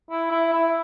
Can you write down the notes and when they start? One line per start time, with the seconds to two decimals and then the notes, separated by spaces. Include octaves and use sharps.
0.11 E4
0.31 E4
0.53 E4